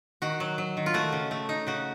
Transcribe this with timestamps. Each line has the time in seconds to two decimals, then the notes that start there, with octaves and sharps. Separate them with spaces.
0.22 D#3 F#4
0.40 F#3
0.58 F#3
0.77 D#3
0.86 F4
0.94 A3 F#4
1.12 C#3
1.31 A3
1.49 D#4
1.67 C#3 F#4